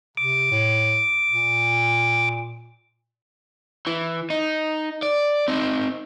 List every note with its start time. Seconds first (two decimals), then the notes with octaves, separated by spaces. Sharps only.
0.17 C3 D6
0.51 A2
1.29 A#2
3.87 E3
4.30 D#4
5.03 D5
5.48 C4 D#4